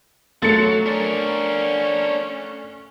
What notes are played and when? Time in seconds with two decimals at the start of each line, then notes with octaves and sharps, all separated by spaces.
0.42 F#3 A3 F4 A6 C#7
0.58 C#5
0.86 C#4 D4 A#4